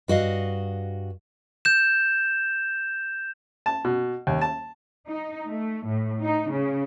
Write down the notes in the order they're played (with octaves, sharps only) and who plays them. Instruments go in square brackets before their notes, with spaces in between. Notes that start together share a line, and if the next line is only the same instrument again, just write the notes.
[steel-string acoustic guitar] G2 F#4 D#5 F5
[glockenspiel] G6 E7
[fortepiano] A5
B2
D#2
A5
[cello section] D#4
A3
A2
D#4
C#3